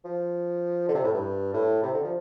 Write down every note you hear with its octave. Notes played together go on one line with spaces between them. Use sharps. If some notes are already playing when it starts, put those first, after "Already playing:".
F3
D3
C3
A2
G2
A2
C3
D3
F3